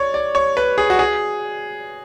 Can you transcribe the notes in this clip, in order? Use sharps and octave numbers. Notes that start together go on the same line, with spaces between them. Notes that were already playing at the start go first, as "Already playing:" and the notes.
Already playing: C#5 D5
D5
C#5
B4
G#4
F#4
G#4